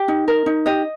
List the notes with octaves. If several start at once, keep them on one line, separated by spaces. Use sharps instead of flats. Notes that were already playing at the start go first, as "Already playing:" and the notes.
Already playing: G4
D#4
A#4
D#4
G4 D#5